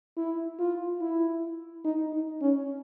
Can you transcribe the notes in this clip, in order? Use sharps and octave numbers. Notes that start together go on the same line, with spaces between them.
E4
F4
E4
D#4
D#4
C#4